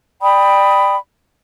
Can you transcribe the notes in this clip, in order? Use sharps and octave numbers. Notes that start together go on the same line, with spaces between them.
D5 G5 B5 D#6